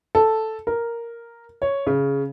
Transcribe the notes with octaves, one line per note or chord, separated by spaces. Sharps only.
A4
A#4
C#5
C#3